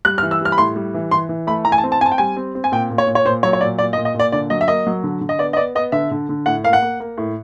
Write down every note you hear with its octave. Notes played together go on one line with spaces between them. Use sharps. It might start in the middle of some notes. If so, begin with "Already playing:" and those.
G3 F#6
F6
E3
E6
G3 F6
B5
A2 C6
G3
E3
E3 C6
E3
A3 B5
E3 A#5
G#5
A5
C4
A5
C4 G#5
A5
G5
G3 G#5
C4
C4
G#5
A#2 G5
A#2
C#5
A#2
C#5
A#2 C5
F#3 C#5
C#5
A#2 D5
A#2 D5
D#5
A#2
D#5
A#2
D5
D3 D5
F#3 D#5
E5
A#3 D#5
F#3
D3
D3
D#5
B3 D5
D#5
B3 D5
B3 D#5
D3 E5
D3
D3
A2 F#5
A#3 F5
F#5
A#3
A#3
A2